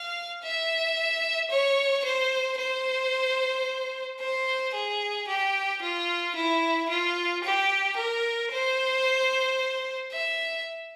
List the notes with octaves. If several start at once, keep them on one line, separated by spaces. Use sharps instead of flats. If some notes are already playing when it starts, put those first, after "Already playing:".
Already playing: F5
E5
C#5
C5
C5
C5
G#4
G4
F4
E4
F4
G4
A#4
C5
E5